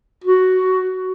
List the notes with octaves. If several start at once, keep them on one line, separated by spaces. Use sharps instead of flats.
F#4